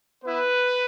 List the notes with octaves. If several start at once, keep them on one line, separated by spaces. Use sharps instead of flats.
B3 E4 B4